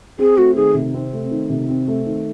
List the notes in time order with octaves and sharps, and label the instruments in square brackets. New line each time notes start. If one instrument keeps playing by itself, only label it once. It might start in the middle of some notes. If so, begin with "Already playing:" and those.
[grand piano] C4 [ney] G#4
[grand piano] A3 [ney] F#4
[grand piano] D#3 [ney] G#4
[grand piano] C3
C4
A3
D#3
C3
C4
A3
D#3